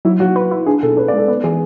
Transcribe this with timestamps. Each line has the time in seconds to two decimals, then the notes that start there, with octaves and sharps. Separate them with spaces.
0.05 F#3 E4
0.20 F#3 F#4
0.36 B4
0.51 E4
0.66 D4 G#4
0.83 B2 A4
0.97 C#4 B4
1.08 D5
1.13 G#3 A4
1.28 B3 B4
1.43 E3 G#4